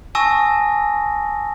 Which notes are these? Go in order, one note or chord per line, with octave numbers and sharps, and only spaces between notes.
G#5 A5 C#6 D#6 E6 A#6